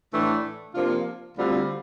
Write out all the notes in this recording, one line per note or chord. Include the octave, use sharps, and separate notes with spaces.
A2 E3 A3 D4
C3 F3 A#3 D4 F4
D2 D3 G3 C4 F4